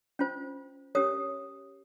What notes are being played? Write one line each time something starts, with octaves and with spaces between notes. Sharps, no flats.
C#4 F4 C5
C#4 G4 A#4 C#5 D#6